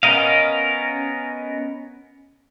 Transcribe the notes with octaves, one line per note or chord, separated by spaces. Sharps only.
B3 C#4 A#4 D#5 F5